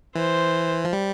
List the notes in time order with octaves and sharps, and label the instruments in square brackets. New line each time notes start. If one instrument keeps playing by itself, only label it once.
[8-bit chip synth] E3 [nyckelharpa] C5
[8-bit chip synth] F3
G3